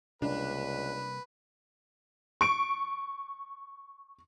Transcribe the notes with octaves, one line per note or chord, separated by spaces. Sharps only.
C#2 C3 G3 A#3 D4 B4
C#6 D7